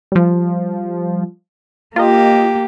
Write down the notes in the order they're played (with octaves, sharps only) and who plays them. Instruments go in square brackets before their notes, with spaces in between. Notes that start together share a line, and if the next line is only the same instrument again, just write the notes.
[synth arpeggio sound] F3 G3
[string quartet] A#3 G4 [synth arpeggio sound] F4 A#4 D#5